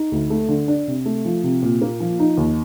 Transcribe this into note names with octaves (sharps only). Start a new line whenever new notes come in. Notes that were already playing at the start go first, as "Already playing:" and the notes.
Already playing: D#4
D2
A3
D3
D4
C3
A3
F3
C3
A#2
A#3
F3
D#4
D#2